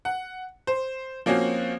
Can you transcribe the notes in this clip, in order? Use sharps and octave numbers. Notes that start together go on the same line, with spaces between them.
F#5
C5
F3 A#3 C4 C#4 F#4